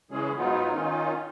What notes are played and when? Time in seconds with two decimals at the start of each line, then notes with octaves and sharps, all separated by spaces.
0.11 C#3 E3 G#3 C#4 G#4
0.37 G#2 F#3 B3 D#4 F4
0.72 D#3 C#4 D#4 F4